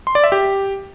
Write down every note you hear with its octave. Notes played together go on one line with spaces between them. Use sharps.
C6
D5
E5
G4